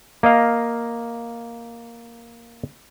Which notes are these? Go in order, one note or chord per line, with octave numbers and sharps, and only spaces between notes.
A#3 D#5 F5